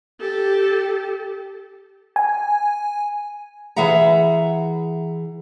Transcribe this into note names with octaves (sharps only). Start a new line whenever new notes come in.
G4 A4
G#5
E3 G#4 E5 F#5 A#5